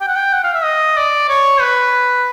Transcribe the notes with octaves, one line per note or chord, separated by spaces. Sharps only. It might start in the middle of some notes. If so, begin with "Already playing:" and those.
G5
F#5
G5
F#5
F5
E5
D#5
D5
C#5
B4